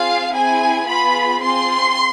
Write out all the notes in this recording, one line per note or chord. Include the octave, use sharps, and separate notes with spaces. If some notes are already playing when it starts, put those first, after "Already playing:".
Already playing: C4 F4 G#4 F5
C4 E4 G#4 G#5
B3 F4 G#4 B5
C4 F4 G#4 C6